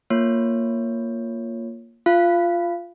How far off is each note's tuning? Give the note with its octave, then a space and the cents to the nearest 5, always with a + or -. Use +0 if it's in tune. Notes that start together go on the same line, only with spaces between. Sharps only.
A#3 +0 F4 +0 C#5 +0
F4 +0 F5 -25